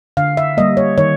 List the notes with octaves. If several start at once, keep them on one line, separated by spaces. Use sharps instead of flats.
D3 F5
E5
G3 A#3 D#5
C#5
D#3 C#5